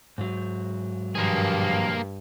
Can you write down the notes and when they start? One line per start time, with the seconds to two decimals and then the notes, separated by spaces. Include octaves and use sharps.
0.18 G#2 F#3
1.15 G2 B2 D#3 F3 A#3 G#4